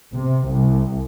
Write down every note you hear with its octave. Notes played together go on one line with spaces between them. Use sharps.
C3
C2